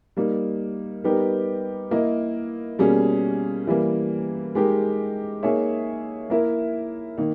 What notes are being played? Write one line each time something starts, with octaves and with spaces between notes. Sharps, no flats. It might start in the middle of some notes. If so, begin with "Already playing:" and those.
G3 A#3 D#4
G3 B3 D#4 G4 A#4
A#3 E4 A#4 D#5
B2 G3 A#3 C#4 G#4
E3 G3 A#3
G#3 D#4 G4 A#4
A#3 D#4 G#4 C#5 E5
A#3 E4 A#4 E5
D#3 A#3 D#4